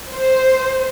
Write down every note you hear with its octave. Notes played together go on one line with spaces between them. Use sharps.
C5